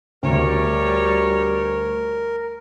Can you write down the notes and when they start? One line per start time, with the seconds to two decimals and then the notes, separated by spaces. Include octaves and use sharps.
0.23 D2 G3 A#4 C#5